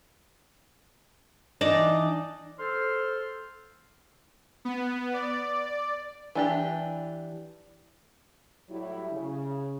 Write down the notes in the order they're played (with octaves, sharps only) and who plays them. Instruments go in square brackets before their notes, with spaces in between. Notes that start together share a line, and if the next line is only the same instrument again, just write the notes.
[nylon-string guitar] E3 D4 D#4 [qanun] D5 D#5 A5
[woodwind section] A4 C5 C6 E6 F6
[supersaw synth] B3
D5
[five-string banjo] E3 D4 G4
[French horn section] A2 F#3 G3 E4
C#3